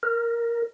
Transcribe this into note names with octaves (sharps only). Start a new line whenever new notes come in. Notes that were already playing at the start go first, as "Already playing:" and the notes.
A#4